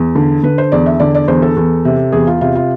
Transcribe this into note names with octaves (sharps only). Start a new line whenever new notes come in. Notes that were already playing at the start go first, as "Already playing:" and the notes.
Already playing: E2
D3
D3 B4
C5
E2 D5
E5
D3 D5
D5
E2 C5
A4
E2
C3
E2 G#4
F4
C3 F4
F4